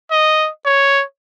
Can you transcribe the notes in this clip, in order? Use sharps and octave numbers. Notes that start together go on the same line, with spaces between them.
D#5
C#5